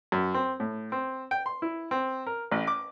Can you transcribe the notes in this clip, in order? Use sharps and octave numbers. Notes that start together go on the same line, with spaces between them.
F#2
C4
A2
C4
G5
C6
E4
C4
A#4
A1
D6